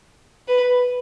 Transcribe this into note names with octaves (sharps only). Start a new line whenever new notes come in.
B4